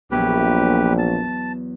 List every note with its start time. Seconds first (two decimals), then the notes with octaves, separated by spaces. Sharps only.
0.11 A#1 E2 F#3 B3 G4 B4
0.98 A5